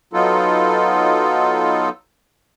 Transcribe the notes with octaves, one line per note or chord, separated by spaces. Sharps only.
F#3 B3 D#4 F4 A4